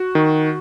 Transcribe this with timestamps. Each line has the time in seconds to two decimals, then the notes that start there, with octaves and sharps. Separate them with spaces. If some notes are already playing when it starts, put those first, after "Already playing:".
Already playing: F#4
0.15 D#3